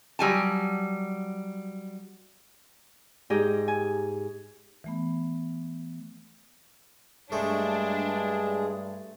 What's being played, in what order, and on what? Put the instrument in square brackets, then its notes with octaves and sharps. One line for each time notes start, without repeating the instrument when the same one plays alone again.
[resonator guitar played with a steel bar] F#3 G3 G#5 A5
[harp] G#2 D#4 G4 G#4 D#5
G#5
[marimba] E3 A3 B3
[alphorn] G2 [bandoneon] G#3 G#4 [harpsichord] A3 [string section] D4